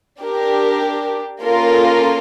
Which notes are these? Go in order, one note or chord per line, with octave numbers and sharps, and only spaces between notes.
D4 G4 A#4
A#3 C#4 F4 A4 A#4